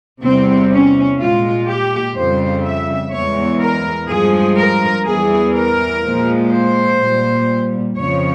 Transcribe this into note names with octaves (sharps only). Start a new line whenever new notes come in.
E2 C3 G3 C4
C#4
A#2 G#3 F4
G4
F2 C#3 G3 C5
E5
E2 E3 G#3 C#5
A#4
G2 F3 G#3 G#4
A#4
E2 E3 G3 G#4
A#4
A#2 F3 G#3
C5
A#2 G3
F2 C#3 F3 C#5